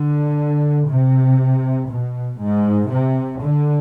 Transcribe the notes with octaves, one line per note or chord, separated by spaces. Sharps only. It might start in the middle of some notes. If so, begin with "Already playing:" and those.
Already playing: D3
C3
B2
G#2
C3
D3